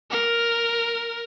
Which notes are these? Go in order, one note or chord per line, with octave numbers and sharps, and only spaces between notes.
A#4